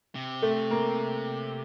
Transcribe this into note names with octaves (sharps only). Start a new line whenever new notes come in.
C3
A3
A#3